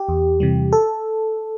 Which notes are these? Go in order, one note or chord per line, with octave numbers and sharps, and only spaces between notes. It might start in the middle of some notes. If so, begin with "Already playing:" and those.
Already playing: G4
E2
C3 E3 G3
A4